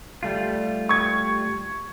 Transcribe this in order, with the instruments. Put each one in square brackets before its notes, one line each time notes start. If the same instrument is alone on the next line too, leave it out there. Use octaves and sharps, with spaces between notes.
[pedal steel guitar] G3 A3 F4
[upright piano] C#6 G#6